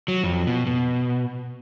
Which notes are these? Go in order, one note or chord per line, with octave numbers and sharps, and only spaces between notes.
F#3
F2
B2
B2